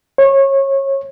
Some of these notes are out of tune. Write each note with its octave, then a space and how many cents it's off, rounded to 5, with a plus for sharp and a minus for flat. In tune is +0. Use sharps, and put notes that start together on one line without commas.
C#5 -25